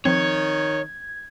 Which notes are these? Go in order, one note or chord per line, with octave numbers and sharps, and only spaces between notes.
D#3 F3 C4 C#5 G#6